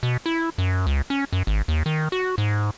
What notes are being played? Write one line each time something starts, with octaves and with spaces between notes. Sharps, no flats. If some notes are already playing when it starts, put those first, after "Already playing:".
B2
E4
F#2
C#2
C#4
F#2
G#1
D#2
D#3
F#4
G#2